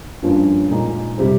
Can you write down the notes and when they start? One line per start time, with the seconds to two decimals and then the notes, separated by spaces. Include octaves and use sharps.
0.22 G2 F3 A#3 C#4 F4
0.70 A#2 G#3 D#4
1.18 C3 G3 C4